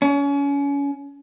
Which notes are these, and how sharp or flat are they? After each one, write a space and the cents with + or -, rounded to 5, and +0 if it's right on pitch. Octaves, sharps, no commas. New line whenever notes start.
C#4 +30